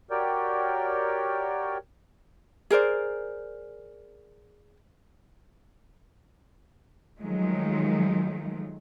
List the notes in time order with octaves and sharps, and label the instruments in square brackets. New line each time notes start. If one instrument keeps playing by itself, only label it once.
[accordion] F#4 G4 A#4 C#5 D5 G5
[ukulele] G#4 A#4 C5 D5
[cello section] D#3 F3 F#3 G#3 A3